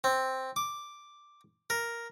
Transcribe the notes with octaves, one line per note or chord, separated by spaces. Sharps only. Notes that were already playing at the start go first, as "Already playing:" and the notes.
C4
D6
A#4